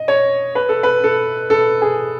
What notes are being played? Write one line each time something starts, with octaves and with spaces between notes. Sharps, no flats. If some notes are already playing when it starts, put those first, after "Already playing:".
Already playing: D#5
C#5
B4
A4
B4
A4
A4
G#4